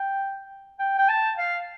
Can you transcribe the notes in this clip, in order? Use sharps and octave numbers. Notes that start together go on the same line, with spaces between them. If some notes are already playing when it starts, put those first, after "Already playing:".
Already playing: G5
G5
G5
A5
F5